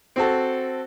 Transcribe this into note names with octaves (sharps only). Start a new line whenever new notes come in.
C4 F#4 A4